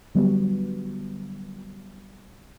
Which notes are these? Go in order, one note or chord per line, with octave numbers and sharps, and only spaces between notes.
D3 F#3 G3 B3